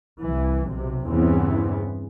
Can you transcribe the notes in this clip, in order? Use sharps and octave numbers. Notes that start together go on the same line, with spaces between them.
C2 E3
B1 C3
E2 G2 C#3 E3 B3 C4